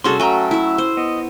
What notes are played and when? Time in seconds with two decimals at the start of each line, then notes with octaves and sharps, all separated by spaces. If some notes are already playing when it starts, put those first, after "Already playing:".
0.04 C2 C#4 F#4 G#4 A4 C6
0.20 F#3 A3 F#4 G5 G#5 A#5
0.51 E4 E5
0.78 C5
0.97 B3 D#5